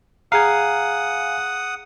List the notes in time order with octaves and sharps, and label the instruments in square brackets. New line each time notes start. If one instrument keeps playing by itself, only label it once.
[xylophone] G#4 A#5 [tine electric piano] F5 G#5 [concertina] F#5 D#6